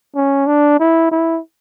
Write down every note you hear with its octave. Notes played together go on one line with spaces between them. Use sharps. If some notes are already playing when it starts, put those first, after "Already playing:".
C#4
D4
E4
E4